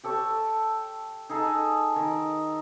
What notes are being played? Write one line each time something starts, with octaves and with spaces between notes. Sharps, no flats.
G4 A4 C#5
D#4 G#4 A4
D#3